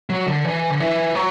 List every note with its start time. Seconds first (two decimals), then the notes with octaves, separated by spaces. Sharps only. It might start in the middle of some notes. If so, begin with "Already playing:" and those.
0.10 F#3
0.27 D3
0.45 E3
0.70 D3
0.80 E3
1.15 F#3